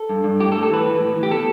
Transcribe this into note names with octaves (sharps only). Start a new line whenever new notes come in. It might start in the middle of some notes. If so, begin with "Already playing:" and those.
Already playing: A4
G2
G2
A2 G4
A4
A2
A4
E3 B4
E3
A2
E3
G4
B2 A4